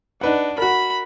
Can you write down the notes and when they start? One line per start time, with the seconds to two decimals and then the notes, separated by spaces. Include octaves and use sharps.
0.21 D4 D#4 B4 F#5
0.58 F#4 A#4 B5